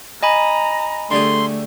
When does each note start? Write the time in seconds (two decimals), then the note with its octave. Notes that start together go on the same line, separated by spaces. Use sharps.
0.23 D#5 G#5 A#5 B5
1.11 D3 G3 A3 G#4 C6